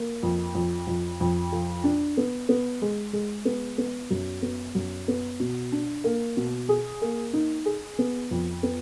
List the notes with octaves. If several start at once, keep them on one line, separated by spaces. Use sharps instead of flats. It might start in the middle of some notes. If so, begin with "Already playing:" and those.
Already playing: A#3
F2
F2
F2
F2
F3
D4
B3
B3
G#3
G#3
B3
B3
F#2
B3
F#2
B3
B2
D4
A#3
B2
G#4
A#3
D#4
G#4
B3
F2
B3